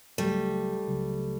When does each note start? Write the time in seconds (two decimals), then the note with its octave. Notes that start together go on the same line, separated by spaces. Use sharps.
0.18 C#2 C#3 F#3 G3 A3
0.87 C#2 C#3 F#3